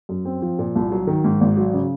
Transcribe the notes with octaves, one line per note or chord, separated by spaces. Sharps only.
F#2
C4
F3
A#2
C2
F#3
D#3
G#2
G#1
F#3
C#3